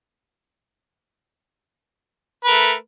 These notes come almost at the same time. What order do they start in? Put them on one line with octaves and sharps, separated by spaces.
B4 A#4 A3